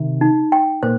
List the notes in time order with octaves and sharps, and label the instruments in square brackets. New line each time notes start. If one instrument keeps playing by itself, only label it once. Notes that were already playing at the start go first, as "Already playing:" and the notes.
Already playing: [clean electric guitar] C3 D#3
[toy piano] D#4
G5
[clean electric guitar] A#2 [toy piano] C5